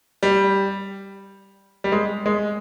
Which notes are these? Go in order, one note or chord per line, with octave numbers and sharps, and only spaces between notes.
G3
G3
G#3
G#3